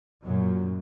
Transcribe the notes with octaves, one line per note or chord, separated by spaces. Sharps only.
F#2 A#2 F#3